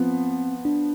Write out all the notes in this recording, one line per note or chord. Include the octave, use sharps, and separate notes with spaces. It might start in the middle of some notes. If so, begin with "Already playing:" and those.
Already playing: F3 B3 C4
D4